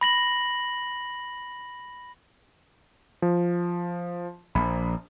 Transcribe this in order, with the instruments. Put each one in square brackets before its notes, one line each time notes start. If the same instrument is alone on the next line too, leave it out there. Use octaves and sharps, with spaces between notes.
[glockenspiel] B5 A#6 F#7
[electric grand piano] F3
[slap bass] A#1 [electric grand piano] B5